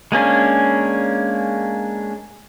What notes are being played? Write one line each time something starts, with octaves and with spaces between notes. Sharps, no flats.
G#3 A#3 C#4 D4